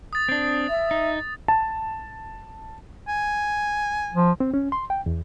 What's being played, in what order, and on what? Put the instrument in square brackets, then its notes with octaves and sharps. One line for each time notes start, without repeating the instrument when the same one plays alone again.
[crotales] D#6 A6
[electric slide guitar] C4 D4
[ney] E5
[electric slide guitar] D#4
[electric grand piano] A5
[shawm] G#5
[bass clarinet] F3
[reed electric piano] C4
C#4
C6
G5
E2